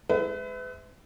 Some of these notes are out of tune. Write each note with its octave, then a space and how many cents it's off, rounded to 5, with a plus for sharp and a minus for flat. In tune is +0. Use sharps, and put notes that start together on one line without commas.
G#3 +0 B4 +35 E5 -15